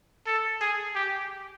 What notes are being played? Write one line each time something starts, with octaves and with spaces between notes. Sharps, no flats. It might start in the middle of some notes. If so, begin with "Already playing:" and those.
A4
G#4
G4